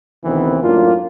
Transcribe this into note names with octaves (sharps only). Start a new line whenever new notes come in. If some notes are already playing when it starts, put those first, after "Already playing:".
D2 C3 D#3 E3 B3 C4
F#2 A2 A#3 D4 F4